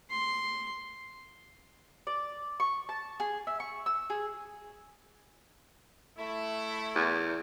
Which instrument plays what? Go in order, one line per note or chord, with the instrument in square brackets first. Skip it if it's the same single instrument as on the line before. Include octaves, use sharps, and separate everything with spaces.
[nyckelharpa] C6
[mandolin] D5
C#6
A5
G#4
E5
C#6
E6
G#4
[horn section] A3 E4
[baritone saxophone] E2